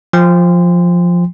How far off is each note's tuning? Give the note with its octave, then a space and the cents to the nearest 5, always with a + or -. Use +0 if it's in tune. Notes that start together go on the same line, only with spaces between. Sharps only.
F3 +5 G5 +40 C6 -20